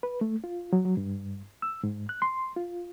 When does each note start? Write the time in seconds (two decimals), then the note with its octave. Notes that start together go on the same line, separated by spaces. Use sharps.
0.03 B4
0.21 A3
0.44 F4
0.73 F#3
0.85 F#3
0.97 G2
1.62 E6
1.83 G#2
2.09 F#6
2.22 C6
2.56 F4